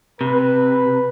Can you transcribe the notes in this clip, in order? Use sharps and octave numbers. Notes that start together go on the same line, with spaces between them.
C3 B4